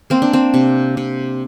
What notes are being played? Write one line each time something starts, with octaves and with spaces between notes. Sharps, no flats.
A#3 C4
D4
C4
C3
C3